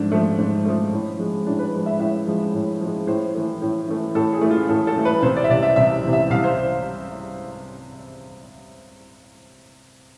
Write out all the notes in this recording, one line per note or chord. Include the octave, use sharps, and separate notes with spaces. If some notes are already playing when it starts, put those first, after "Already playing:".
Already playing: G#2 F3 A3 D4
F3 A3
G#2
F3 A3
A2
F3 G#3
A2 D4
B4
F3 G#3
E5
A2 E5
F3 G#3
A2
F3 G#3
A2 C5
E3 A3
A2
E3 A3
A2 A4
G#4
E3 A3
F4
A2 A4
A4
E3 A3
B4
C2 C5
D5
E5
C3 E3 D5
E5
C2 E5
C3 E3
E5
C2 F5
C5